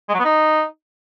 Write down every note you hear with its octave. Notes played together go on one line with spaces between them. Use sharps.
G#3
F#3
B3
D#4